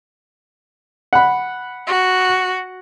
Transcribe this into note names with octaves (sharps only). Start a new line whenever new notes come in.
F#5 B5
F#4